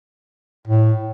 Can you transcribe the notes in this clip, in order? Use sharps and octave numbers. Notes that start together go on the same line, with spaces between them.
A2